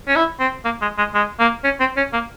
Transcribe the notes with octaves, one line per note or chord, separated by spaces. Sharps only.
C#4
E4
C4
A#3
G#3
G#3
G#3
A#3
C#4
C4
C#4
A#3